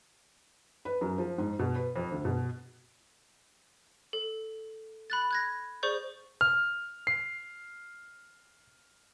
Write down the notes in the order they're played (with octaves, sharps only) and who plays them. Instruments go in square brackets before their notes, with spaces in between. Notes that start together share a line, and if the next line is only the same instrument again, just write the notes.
[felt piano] B4
F#2
F3
G#2
B2
B4
F2
D2
B2
[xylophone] A4
B5 F#6 A6
F#6 G#6 A#6
G#4 C5 D5 C#6 G6
[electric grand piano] F6
C7